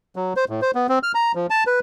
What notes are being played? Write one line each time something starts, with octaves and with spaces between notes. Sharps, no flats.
F#3
C5
A2
C5
B3
C4
F6
A#5
F3
A5
B4